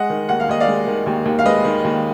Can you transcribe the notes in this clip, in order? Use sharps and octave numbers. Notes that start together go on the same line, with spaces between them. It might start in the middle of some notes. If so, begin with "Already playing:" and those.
Already playing: G#3 D#5 F#5
D#3
D#2 F#5
F5
D#2 D#5
D5 F5
G#3
D#3
D#2
D#2
F5
G#3 B4 D#5
D#3
D#2